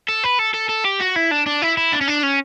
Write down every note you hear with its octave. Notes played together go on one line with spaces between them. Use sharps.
A4
B4
A4
A4
A4
G4
F#4
E4
D4
D4
E4
E4
D4
C#4
D4
C#4